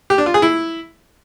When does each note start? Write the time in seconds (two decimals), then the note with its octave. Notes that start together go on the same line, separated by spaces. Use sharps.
0.10 G4
0.18 D4
0.26 F4
0.34 G#4
0.42 E4